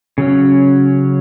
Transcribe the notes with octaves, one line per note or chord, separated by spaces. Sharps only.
C#3 F#3 C#4